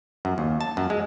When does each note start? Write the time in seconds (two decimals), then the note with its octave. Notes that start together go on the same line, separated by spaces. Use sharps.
0.25 F#2
0.38 D#2
0.61 A5
0.77 F#2
0.90 G#3